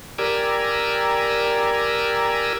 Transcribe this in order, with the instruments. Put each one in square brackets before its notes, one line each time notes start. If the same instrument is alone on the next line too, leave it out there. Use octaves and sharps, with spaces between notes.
[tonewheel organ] G4 A#4 D5 G#5 A#5 E6